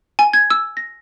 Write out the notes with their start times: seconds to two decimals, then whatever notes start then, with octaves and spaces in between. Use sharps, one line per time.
0.19 G#5
0.33 G#6
0.50 E6
0.77 A#6